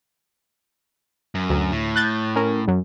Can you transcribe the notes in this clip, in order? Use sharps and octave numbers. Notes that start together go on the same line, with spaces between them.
F#2
D2
A2
F#6 G6 A6
C#4 A#4
F#2